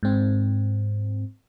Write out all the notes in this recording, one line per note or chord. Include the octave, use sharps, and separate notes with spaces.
G#2 C4